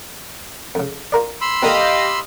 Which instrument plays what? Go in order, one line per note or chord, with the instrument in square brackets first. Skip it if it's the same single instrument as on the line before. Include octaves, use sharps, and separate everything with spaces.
[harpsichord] F2 C#3
F4 A#4 D5
[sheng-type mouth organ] B5 C6 E6
[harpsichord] D3 A#3 C4 [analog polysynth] G4 D#5 F5